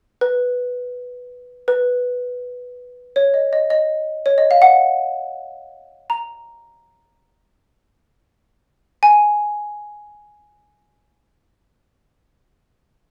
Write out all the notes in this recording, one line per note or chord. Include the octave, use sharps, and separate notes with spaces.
B4
B4
C#5
D#5
D#5
D#5
C#5
D#5
F5
F#5
A#5
G#5